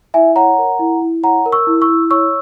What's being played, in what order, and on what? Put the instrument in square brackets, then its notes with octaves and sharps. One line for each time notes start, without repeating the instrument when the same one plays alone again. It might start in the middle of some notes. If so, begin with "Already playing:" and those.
[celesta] E4 E5 G#5
C#5 F#5 A#5
A#4
E4
E4
C#5 F#5 A#5
A#4
C#6 E6
E4
C#6 E6
E4
C#5 C#6 E6